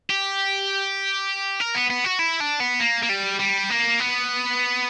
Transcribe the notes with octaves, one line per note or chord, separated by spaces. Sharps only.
G4
A#4
B3
B3
F#4
E4
D4
B3
A#3
A#3
G3
G3
A#3
B3